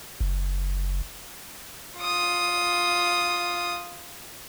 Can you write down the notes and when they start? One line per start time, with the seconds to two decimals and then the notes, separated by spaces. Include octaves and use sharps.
0.20 F#1
1.99 F4 D#6